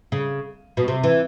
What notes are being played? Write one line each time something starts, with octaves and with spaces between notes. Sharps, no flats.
C#3
B2
C3
E3